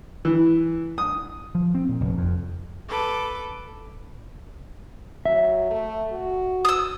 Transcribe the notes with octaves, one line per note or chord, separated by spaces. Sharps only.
E3
D#6
F3
C4
A#2
F1
F2
A4 B4 D6
F#3 E5
A3
F#4
D#6 E6